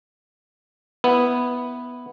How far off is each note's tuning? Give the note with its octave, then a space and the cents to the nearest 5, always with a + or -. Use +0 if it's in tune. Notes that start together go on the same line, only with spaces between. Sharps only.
B3 +0 E4 +0